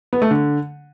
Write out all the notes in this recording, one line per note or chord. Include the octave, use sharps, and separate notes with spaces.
B3
A3
D3